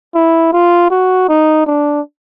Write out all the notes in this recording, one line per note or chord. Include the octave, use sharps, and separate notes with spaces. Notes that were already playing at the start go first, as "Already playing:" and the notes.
E4
F4
F#4
D#4
D4